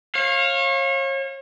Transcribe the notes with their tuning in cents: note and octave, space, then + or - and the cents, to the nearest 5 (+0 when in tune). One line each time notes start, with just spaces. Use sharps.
C#5 -35 F5 +0